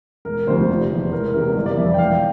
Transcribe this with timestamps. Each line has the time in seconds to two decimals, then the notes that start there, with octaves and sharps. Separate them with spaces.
0.25 E1 A#4
0.47 D2 C3 F3 C5
0.69 F1
0.91 E2 E3
1.12 E1 A#4
1.33 E2 C3 E3 A#4
1.55 G1 A#4
1.66 D5
1.77 F2 E3 E5
1.94 G5
1.98 E1 F5
2.09 G5